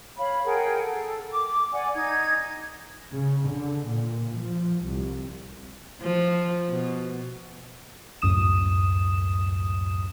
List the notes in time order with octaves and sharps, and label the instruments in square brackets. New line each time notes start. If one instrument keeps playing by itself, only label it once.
[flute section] C#5 F5 B5
G#4 A#4 F#5 G5
A4
D6
D5 F#5 G#5
D#4 G#6
[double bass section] C#3
D3
A#2
F3
C2
[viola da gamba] F3
B2
[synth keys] C#2 F#2 A2 D#6 E7